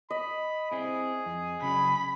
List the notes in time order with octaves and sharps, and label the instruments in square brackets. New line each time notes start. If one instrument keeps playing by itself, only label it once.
[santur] D#5 [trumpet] B5
[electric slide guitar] C4 E4 [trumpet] G#4
[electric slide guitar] F2
[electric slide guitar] C#3 F#3 [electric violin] B5